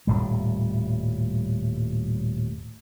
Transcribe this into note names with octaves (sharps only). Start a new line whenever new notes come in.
D#1 A2 G3